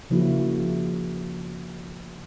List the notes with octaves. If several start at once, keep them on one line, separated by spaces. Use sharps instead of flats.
C#3 F3 A#3 E4 F#4